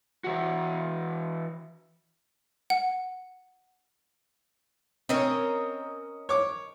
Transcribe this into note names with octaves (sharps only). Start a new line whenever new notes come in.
E3 F#4
F#5
C4 C#4 A#4 C#5 D#5
C#5 D6